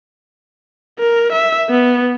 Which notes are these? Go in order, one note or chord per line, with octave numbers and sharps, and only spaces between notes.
A#4
E5
B3